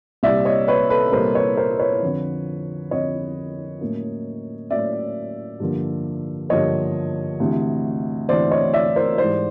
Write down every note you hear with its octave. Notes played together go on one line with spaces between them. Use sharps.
C2 A#2 G3 D5 E5
C#5 D#5
B4 C#5
A4 B4
C2 A#2 G3 A#4 C5
B4 C#5
A#4 C5
B4 C#5
F2 D3 F3
F2 D3 F3 C#5 D#5
A2 F#3 A#3 C#4
A2 F#3 A#3 C#4 D5 E5
G2 D3 F3 A#3
G2 D3 F3 A#3 C#5 D#5
D2 C3 E3
D2 C3 E3 C5 D5
C#5 D#5
D5 E5
A#4 C5
G#2 E3 G3 C5 D5